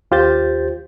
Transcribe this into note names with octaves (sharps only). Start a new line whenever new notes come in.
D#2 F4 G4 C5 G6 A6